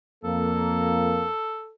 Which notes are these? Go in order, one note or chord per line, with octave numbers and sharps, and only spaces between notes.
F2 A#3 A4